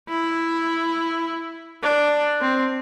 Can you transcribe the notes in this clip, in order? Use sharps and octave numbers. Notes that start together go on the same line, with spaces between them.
E4
D4
C4